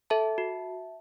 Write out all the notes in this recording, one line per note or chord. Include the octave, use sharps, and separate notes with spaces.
A4 E5 A5
F#4